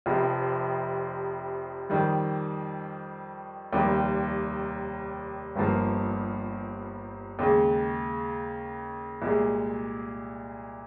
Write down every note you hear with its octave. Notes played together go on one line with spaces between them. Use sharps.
F1 F2 C3 F3
F2 D#3 G3
F1 D#2 D#3 G3
G1 G2 F3 A#3
D#2 C#3 G#3
C2 A#2 G#3